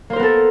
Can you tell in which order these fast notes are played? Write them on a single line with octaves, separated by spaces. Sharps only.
A#3 C5 A#4 B3 A4